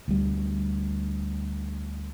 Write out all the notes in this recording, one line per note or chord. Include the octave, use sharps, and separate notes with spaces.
D2 G3